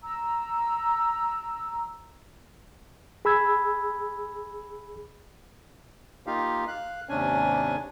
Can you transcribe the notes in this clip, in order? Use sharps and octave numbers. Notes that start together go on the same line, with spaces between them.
A#5 E6
G#4 B5 E6 G#6
A#3 D#4 F4 G4 F5
F5 F#6
D#2 G#2 C3 C#4 D4 G#5